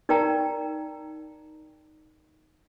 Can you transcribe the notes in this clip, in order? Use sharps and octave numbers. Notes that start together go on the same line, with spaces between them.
D#4 A#4 D5 G5 A5 A#5